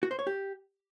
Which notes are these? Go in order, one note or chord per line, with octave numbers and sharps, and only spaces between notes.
F#4
C5
C#5
G4